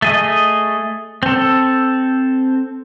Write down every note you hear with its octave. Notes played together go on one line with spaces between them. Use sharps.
A3 G#4 D#5
C4 A4